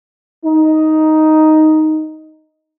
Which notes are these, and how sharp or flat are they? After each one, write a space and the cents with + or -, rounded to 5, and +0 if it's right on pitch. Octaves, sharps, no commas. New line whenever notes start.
D#4 +5